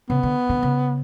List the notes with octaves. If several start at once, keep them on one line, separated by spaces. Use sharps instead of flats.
C#3 B3
D3
D3
C#3